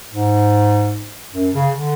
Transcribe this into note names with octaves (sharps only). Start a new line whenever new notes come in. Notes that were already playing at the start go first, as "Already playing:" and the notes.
G#2
F#2
C#3
D3